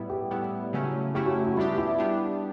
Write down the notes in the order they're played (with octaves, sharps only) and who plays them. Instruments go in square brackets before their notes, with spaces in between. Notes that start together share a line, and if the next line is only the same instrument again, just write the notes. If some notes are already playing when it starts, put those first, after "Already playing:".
Already playing: [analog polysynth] A2 G3 B3 E4
[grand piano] G4
[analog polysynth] A2 G3 B3 E4
C#3 F#3 A3 C#4 E4
[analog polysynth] C#3 F#3 A3 C#4 E4 [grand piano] G4
[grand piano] F#4
G4
F#4
[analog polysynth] G3 B3 D4 G4 [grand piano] E4
[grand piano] E4
[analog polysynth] G3 B3 D4 G4